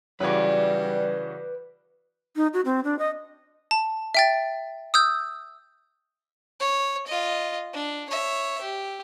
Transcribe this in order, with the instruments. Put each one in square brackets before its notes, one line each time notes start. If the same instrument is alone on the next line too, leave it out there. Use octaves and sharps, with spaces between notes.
[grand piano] C#3 E3 F#4 [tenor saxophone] G3 [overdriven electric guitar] B4 D5
[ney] D#4
F#4
C4
D4
D#5
[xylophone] A5
E5 G5 A6
D#6 E6 G6
[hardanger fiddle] C#5
F4 D#5
D4
C#5 E5
G4